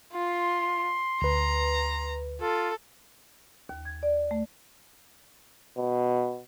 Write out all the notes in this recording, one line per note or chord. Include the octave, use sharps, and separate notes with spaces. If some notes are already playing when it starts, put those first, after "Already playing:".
F4 C6
D2 B4 A#5
F4 A4
D#2
G#6
D5
A3
B2